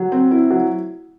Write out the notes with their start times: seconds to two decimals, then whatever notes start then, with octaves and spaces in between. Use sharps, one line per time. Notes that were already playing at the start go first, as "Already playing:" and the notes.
Already playing: F#3
0.12 C4
0.31 E4
0.51 F#3